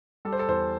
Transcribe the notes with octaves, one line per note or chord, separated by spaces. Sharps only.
G3 A4
C5
A4
E2 C5